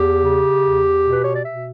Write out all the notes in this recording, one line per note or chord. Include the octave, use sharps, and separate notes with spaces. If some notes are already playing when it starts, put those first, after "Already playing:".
Already playing: E2 G4
C#3
E2
B2
B4
C#5
D5
B2 E5